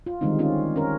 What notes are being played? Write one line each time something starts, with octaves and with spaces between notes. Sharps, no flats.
F4
D3 D#3 G3 G#3 C4 D#4
C4 C#4 F4
C#4 A#4